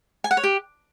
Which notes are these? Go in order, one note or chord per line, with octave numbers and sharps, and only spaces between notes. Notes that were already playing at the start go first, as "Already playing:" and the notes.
G#5
F#5
C#5
G4